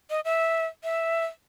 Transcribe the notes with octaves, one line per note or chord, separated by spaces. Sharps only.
D#5
E5
E5